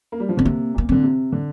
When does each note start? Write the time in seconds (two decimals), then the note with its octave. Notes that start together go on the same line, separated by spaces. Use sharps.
0.12 A#3
0.20 G3
0.29 F3
0.37 D3 C4
0.45 C3 A#3
0.74 A#2 A#3
0.89 D3 C4
1.04 C3
1.32 D3